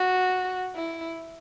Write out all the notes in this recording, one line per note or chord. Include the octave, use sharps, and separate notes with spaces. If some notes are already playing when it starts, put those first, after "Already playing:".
Already playing: F#4
E4